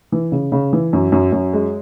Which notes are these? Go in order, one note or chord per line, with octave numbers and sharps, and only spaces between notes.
E3
C#3
C#3
E3
F#2
F#2
F#2
G#3